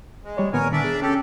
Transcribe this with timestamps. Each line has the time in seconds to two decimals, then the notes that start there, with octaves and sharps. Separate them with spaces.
0.24 G#3
0.37 G3 C#5 D5
0.53 A#2 D#3 B3 A#4 C#5 G#5
0.72 D3 D4 D5 E5
0.84 G#4
1.02 C#4 G4 A4